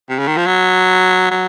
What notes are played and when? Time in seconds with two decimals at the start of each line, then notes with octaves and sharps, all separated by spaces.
0.10 C3
0.19 C#3
0.27 D#3
0.37 F3
0.46 F#3
1.31 F#3